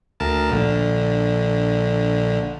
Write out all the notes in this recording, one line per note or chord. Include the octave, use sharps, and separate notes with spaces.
D2 A#4 A5
A#1 D3